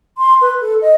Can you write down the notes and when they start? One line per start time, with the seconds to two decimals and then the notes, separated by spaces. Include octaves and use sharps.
0.18 C6
0.41 B4
0.61 A4
0.81 D#5